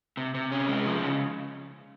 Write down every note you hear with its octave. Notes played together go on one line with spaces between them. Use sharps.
C3
C3
C#4
G#3
F3
C#3